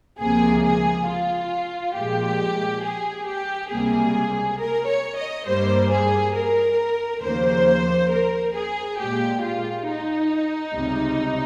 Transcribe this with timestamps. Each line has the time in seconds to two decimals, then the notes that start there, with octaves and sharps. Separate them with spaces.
0.19 C#2 C3 F3 A#3 G#4
0.63 G#4
1.07 F4
1.95 A#2 F3 G#3 G4
2.83 G#4
3.27 G4
3.70 C#2 C3 G3 A#3 G#4
4.59 A#4
4.88 C#5
5.17 D#5
5.47 G2 G3 A#3 C5
5.91 G#4
6.35 A#4
7.22 D#2 C#3 F3 A#3 C5
8.10 A#4
8.54 G#4
8.98 A#2 G#3 G4
9.42 F4
9.87 D#4
10.74 C#2 C3 G3